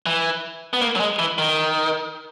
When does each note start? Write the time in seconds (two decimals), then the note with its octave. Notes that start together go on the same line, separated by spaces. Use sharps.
0.06 E3
0.73 B3
0.82 A#3
0.96 F#3
1.00 G#3
1.19 E3
1.38 D#3